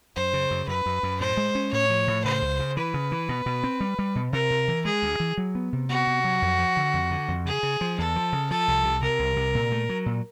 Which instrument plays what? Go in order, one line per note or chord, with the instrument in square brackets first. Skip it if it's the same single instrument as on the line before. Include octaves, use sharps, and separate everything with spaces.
[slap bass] F#2 [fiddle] C5
[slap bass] C#3
F#2
[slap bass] F#2 [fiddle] B4
[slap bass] F#2
F#2
[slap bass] A2 [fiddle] C5
[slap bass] G#3
C#4
[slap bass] A2 [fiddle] C#5
[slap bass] F3
A2
[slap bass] C#3 [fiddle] C5
[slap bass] C#2
C#3
[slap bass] E3 [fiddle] B4
[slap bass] C#3
E3
B2
B2
C4
G3
G3
B2
[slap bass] C3 [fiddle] A#4
[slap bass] C3
E3
[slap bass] G#3 [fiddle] G#4
[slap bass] D2
E3
F#3
B3
C3
[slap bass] B3 [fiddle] F#4
[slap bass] C3
F#3
F2
F3
D3
F2
D3
F2
[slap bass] C#3 [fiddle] G#4
[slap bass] C#3
F3
[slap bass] E2 [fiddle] A4
[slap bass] F3
C#3
[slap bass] F3 [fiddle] A4
[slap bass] C2
C3
[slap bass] C3 [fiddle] A#4
[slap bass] C2
C3
A#2
A3
F#3
A#2